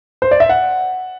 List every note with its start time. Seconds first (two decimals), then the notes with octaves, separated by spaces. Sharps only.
0.22 C5
0.31 D5
0.40 E5
0.49 F#5